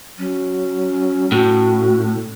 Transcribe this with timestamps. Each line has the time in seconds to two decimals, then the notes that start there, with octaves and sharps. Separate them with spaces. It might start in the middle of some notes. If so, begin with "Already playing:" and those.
0.18 F#3 C#4
1.32 A2 F#4